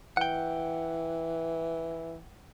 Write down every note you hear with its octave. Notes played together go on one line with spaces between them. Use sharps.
E3 F#5 G5